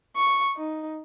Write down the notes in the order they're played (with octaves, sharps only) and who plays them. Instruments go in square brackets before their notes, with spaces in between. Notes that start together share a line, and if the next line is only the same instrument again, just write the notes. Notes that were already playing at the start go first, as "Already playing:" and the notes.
[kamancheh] C#6
D#4